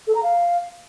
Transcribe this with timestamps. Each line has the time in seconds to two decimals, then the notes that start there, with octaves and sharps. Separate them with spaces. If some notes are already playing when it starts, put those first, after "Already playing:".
0.07 A4
0.15 A#5
0.23 F5